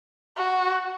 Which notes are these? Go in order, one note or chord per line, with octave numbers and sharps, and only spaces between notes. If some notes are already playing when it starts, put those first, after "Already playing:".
F#4